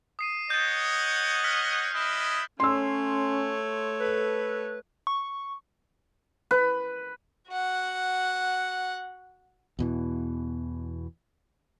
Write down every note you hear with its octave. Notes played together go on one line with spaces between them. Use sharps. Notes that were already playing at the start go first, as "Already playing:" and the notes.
D#6 C7 D#7
C#5 D#5 F#5 G6 A6
F6 F#6 B6
C#4 E4 D#5
A3 C#4 C#5 C6 E6
A4 B4
C#6
B4
F#4 F#5
E2 B2 E3